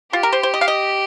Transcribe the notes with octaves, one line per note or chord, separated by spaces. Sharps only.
F4 G4
A#4
C5
C5
D#5
F5
D#5